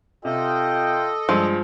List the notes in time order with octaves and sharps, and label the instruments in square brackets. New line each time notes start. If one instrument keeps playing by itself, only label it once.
[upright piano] C3 [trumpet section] F4 G5 [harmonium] A4 D#5
[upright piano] G2 G#3 [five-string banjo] F3